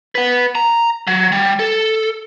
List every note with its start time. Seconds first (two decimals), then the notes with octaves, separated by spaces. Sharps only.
0.15 B4 F#5
0.55 A#5
1.07 F#3
1.32 G3
1.59 A4